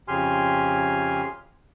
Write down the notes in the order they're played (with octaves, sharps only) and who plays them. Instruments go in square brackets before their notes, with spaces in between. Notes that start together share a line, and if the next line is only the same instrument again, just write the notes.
[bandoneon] F2 C#3 G4 G#5 C6 F6